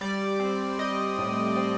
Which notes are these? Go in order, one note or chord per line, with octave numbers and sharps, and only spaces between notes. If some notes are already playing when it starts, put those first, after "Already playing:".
G3 D5
C4
G3 D#5
A2
C4